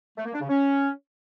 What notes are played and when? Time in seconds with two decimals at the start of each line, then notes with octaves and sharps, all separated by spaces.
0.17 A3
0.25 A#3
0.33 D4
0.41 C#3
0.49 C#4